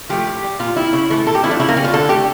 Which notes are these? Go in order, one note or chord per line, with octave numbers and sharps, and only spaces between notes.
F3 A3 G4
A2
G3
A#2 F4
G3 E4
C#3
E3 A3
A#2 A4
G4
F3 A3 E4
D4
C#3 E4
A#3
G3 C#4
F4
D3 A4
A3 G4